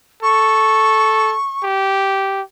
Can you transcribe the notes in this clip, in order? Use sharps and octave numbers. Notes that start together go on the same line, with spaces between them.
A4 C#6
G4